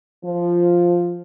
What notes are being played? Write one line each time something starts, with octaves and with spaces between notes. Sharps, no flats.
F3